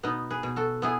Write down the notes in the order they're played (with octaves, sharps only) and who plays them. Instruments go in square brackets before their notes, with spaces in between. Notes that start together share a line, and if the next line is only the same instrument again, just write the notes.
[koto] B2 B3 D#4
G#4 B4
B2
F#4 A4
B3 E4 G#4